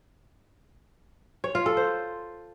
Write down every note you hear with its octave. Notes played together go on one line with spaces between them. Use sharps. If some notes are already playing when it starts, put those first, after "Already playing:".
C#5
F4
A4
C5